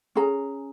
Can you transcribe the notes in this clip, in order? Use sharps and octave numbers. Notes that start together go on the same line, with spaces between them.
C#4 G#4 A#5